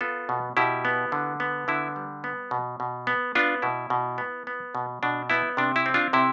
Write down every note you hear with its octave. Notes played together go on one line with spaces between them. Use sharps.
B3 F4 A4
B2
B2 E4 G4
B3
D3
B3
D3 E4
G3
B3
B2
B2
B3
B3 D4 F4
B2 E4
B2
B3
B3
B2
B2 D4
B3 E4
C3 D4
E4
C4
D4 F4
C3 E4